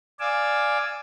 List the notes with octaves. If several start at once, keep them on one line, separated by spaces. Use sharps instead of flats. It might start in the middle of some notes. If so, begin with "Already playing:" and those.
D5 F5 G#5 D6 E6